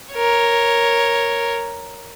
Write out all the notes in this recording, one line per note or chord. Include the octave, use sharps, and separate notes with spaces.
A#4 C#5